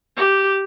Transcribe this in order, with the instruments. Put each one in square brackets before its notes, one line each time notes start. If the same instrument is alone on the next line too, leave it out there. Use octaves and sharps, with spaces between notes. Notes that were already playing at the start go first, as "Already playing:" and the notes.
[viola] G4